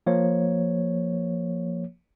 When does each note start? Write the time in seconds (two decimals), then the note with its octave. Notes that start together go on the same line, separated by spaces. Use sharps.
0.06 F3 A#3 C#5